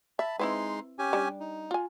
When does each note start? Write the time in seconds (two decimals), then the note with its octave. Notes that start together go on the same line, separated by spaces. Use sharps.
0.19 E5 A5 B5
0.39 G#3 C4 D#4 E4 B4 C6
0.99 C#4 G4 G#5
1.13 G3 D4
1.40 D#4
1.71 F4 G#5